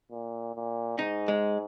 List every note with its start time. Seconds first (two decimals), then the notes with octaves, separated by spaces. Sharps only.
0.11 A#2
0.56 A#2
0.99 G#2 D#4
1.28 G#3